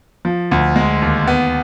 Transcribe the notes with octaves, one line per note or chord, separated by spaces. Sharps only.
F3
D2
G#3
D#2
B3